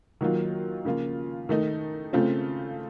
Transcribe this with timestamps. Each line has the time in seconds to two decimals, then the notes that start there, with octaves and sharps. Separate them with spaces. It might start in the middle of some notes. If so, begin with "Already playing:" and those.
0.21 D#3 F#3 A#3 F4
0.85 C#3 F3 A#3 F4
1.49 D#3 A3 D#4
2.13 C#3 A3 C4 F4